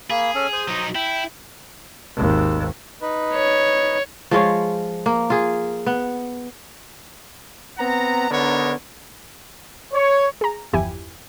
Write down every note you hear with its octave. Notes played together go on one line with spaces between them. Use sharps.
A#3 G#4 B5
C#4 A4
C5 D#6
F#3 D#4
E4 G5
G#1 D#2
D#4 B4
C#5
F3 G#3 F4 C#5
A#3
F4 G#4
B3
B3 C4 F#5 A#5
D3 B3 D4 D#4 A#4 C#5
C#5
G#4 A#5
G1 E2 F3 E4 G4 G#5